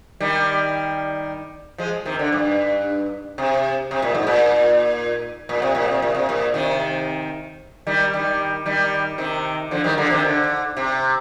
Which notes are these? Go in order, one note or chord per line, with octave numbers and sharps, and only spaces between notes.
D#3 G3
F3 G#3
C3 D#3
D3
G2
C3
C3
A#2
G#2
A#2
A#2
C3
A#2
C3
A#2
C3
A#2
C3 D#3
D#3 G3
D#3 G3
D#3 G3
C3 D#3
D3 F3
D#3 G3
D3 F3
C3 D#3
D3
C3